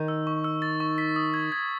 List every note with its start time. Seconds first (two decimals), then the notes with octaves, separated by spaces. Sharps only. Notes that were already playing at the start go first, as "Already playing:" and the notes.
Already playing: D#3 D#4
0.08 E6
0.27 C#6
0.44 E6
0.62 A6
0.80 C#6
0.98 B6
1.16 D#6
1.34 G#6
1.52 G#6